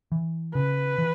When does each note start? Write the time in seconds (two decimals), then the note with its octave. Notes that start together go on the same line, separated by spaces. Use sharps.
0.12 E3
0.55 C#3 B4
0.98 E3